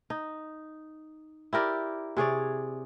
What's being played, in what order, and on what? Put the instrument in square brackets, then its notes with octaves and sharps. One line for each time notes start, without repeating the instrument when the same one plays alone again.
[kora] D#4
E4 G4 A#4 D5
C3 G#4 C#5 D5